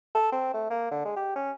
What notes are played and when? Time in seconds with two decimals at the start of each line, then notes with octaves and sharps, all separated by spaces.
0.15 A4
0.32 C4
0.54 A3
0.70 A#3
0.91 D3
1.05 G#3
1.16 G4
1.36 C#4